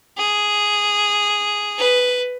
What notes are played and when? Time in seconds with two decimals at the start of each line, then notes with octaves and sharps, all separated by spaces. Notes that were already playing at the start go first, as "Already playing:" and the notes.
0.18 G#4
1.78 B4